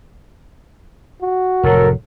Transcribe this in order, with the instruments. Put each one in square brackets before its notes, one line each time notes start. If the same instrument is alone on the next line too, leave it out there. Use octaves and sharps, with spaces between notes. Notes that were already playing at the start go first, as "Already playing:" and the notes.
[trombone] F#4
[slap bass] F1 A2 [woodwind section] F#3 A4 A#4